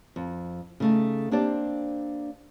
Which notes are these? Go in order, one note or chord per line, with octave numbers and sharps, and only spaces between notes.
F2
C#3 A3 D#4
A#3 C4 D4 G4 C5 D5